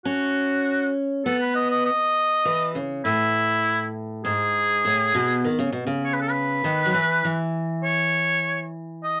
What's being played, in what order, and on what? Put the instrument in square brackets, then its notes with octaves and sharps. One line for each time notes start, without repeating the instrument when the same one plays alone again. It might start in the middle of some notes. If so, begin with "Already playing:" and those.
[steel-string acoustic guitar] C#4 [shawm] F#4
[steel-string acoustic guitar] B3 [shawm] A4
[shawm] B4
D#5
D#5
D#5
[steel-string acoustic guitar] E3
C#3
[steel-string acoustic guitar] A2 [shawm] E4
[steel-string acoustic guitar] G#2 [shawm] G#4
[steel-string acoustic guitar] A2
B2
D#3
C#3
B2
C#3
[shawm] C#5
B4
A4
B4
[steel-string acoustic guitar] D#3
F#3
E3
E3
[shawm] C#5
D#5